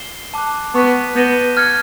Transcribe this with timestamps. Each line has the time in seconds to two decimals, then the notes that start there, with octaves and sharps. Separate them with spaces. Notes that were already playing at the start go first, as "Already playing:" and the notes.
Already playing: C7 E7 G7
0.34 A5 D6 F#6
0.74 B3 A5 C#6 F#6 B6 D#7
1.16 B3 G6 A#6 D#7 G7
1.57 F6 G#6 C#7